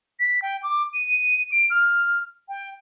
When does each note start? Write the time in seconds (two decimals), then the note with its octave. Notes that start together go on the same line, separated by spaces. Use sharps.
0.20 B6
0.42 G5
0.63 D6
0.94 D#7
1.52 D7
1.70 F6
2.48 G5